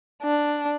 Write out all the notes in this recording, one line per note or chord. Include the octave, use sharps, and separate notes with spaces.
D4